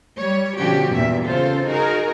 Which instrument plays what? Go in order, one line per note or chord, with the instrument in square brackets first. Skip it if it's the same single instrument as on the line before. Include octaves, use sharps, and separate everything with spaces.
[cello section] G3 C#5
B2 D3 F3 C#4 F#4 G4
E2 G2 A#2 E5
C#3 F4 A4 C5
D#4 F#4 G#4 A#4